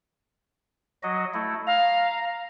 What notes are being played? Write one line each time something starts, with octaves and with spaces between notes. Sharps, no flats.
F#3 F#4 D#5
A3 E4
F5 A#5